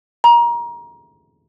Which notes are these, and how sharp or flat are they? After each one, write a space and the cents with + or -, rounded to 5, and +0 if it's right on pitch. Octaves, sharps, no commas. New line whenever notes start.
A#5 +25